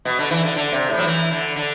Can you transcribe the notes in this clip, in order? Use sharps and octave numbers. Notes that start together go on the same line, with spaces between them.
B2
D3
E3
D3
D3
C3
A2
F#3
E3
D3
D3